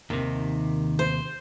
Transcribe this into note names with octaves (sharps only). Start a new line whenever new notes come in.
D#2 C3 D#3
C5